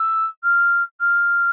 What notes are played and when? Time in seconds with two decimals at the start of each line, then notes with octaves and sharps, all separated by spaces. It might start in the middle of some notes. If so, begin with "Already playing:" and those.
Already playing: E6
0.43 F6
1.00 F6